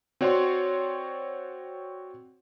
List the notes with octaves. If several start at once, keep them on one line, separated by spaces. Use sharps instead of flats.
C4 F#4 C#5 D5 F#5 C6